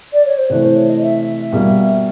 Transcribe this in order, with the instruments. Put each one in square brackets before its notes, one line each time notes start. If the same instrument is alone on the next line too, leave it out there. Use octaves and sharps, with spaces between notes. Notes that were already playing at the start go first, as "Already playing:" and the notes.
[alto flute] D5
C#5
C5
[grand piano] C3 E3 A3 [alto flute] B4
[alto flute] C5
C#5
D#5
E5
[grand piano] B2 G3 A#3